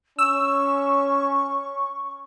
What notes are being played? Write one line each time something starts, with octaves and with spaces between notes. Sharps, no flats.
C#4 C#6 E6